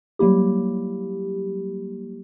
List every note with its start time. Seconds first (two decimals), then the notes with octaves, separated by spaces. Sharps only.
0.19 F#3 G3 A#3 E4 G4